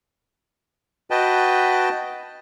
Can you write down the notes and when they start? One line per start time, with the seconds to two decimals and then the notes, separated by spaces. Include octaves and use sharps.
1.11 F#4 B4 D#5 G5 A5